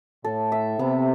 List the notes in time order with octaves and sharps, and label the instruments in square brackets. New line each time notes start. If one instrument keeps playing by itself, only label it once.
[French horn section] A2 [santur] A4
[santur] E5
[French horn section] C3 [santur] B3